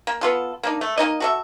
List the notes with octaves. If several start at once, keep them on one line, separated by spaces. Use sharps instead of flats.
A#3
B3 F4 A4
A#3 D4 D#4
A3
A#3 C4 D#4 D#5
F#4 A4 E5